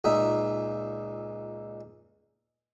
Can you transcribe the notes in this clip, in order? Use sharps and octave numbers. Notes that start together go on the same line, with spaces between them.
C#2 A#2 D#4 E5